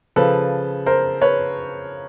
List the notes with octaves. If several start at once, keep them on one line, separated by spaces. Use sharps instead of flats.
C#3 F3 A4 B4
A#4 C5
B4 C#5